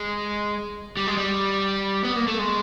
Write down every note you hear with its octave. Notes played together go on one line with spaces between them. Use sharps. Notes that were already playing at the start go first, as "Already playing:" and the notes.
Already playing: G#3
G3
G#3
G3
B3
A#3
A3
G#3